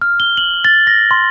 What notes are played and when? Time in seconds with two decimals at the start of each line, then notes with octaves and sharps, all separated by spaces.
0.01 F6
0.20 G7
0.37 F#7
0.65 A6
0.87 A#6
1.11 C6